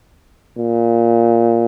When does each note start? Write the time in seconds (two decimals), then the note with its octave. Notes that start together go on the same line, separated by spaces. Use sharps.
0.58 A#2